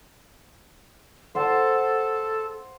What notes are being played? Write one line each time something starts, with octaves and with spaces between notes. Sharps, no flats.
A4 C5 F#5 C6